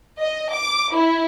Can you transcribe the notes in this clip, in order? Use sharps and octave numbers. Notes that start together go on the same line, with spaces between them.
D#5
D6
E4